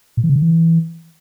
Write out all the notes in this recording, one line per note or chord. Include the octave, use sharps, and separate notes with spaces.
A#2
E3
C#3
D3
E3